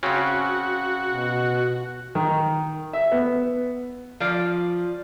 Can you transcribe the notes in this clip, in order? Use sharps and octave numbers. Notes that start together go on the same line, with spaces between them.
C#3 C4 C#4 F#4
B2
D#3
E5
B3
F3 F4 D5